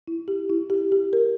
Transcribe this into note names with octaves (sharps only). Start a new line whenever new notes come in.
E4
G4
E4
G4
G4
A#4